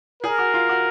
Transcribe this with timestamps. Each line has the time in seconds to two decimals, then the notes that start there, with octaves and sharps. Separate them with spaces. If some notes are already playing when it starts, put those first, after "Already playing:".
0.22 G#4 A#4
0.39 F#4
0.54 F4
0.69 F#4